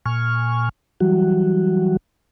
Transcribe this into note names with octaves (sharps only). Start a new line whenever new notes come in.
A#2 G#5 C#6 F6
E3 F#3 G3 F#4